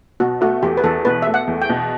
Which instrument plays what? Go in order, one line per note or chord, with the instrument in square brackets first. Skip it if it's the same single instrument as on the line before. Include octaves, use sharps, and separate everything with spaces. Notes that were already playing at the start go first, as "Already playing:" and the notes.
[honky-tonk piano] B2 [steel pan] F#4
[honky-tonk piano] A3 [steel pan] F#4
[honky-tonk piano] E2 [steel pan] G4
[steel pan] B4
[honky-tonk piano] E2 [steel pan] A4
[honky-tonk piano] B2 [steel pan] B4
[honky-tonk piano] A3 [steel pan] E5
[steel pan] F#5
[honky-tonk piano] E2
[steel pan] G5
[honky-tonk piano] B2